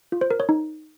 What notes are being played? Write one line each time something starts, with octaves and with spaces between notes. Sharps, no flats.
F4
C5
A#4
C#5
D#4